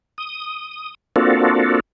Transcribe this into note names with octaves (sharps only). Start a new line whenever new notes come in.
D#6
A#3 C4 D4 F4 F#4 A4